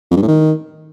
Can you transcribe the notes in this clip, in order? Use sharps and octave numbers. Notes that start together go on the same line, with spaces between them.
F2
G2
A2
D#3